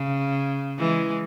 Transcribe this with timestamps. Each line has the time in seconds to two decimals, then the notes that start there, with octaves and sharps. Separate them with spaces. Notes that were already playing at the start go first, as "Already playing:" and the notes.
Already playing: C#3
0.79 E3 G#3